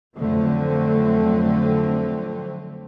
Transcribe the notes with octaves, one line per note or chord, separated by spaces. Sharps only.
F2 D3 F#3 A3 C4